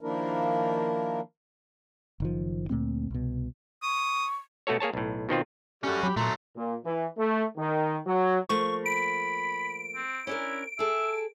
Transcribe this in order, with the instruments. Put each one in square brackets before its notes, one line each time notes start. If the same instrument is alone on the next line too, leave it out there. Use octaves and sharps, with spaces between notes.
[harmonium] D#3 F3 A#3 D4 E4 A#4
[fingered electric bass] F#1 D#3 F3
D2 A#2 A3 C4
C2 B2
[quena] C#6 [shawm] D#6
[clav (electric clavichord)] B2 A3 F#4 A4 C#5
A#3 G#4 C#5 A5
B1 A2
B2 D#3 C4 F4
[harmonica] G3 A3 [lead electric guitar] C#4 F#4
[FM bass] F#3 [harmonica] G4 B5
[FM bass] A#2 [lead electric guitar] F#3 A3 [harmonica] A#5 C6
[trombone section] A#2
E3
A3
D#3
F#3
[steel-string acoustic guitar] F3 A3 A#3 [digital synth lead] C#6
[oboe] B5 [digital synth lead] D7
[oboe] C4
[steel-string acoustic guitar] C#4 D4 A#4 [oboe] E4
[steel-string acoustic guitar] G#4 A4 [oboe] E5